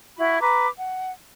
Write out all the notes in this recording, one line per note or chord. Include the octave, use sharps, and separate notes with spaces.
E4 F#4 B5
B4 A#5 D6
F#5